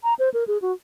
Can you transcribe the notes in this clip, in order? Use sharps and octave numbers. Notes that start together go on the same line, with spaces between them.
A#5
C5
A#4
G#4
F#4